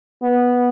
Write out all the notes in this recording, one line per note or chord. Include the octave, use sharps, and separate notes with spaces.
B3